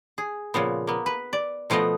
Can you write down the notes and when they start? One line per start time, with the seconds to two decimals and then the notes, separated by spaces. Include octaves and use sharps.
0.18 G#4
0.54 A#2 C#3 F3 B3
0.87 A#3 B3
1.06 B4
1.33 D5
1.70 B2 F3 A3 B3 D#5